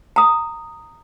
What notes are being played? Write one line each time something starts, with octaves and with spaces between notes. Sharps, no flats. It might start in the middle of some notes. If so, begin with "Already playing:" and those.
A#5 D#6